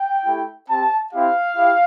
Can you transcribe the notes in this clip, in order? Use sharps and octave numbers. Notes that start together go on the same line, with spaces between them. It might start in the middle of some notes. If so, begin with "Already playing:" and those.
Already playing: G5
A3 E4 G4
C4 G4 A5
C4 E4 G4 F5
E4 G4